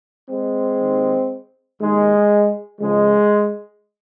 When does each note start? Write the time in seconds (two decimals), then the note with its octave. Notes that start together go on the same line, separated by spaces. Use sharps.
0.30 G#3 C4
0.80 D#2 D#3
1.81 D#2 D#3 G#3
2.81 C#2 C#3 F3 G#3